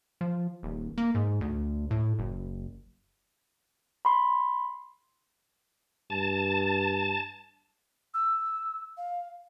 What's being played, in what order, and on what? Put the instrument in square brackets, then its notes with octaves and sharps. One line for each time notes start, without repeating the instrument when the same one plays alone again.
[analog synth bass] F3
D#1
A#3
G#2
D2
A2
F#1
[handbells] B5 C6
[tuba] G2 [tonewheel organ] A5
[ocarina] E6
F5